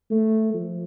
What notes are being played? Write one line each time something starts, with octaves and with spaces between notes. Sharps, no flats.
A3
F3